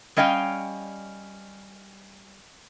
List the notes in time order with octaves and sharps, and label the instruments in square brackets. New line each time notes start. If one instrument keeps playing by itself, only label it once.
[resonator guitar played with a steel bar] G3 C#4 D#5 F5 G5